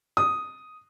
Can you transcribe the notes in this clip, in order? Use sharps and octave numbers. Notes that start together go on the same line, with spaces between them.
D#6